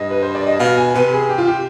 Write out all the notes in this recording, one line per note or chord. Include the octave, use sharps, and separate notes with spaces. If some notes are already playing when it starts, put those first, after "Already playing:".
Already playing: G2 D#5
B4
C5
D5
D#5
B2 F5
G#5
C3 B4
G#4
G4
F4
G4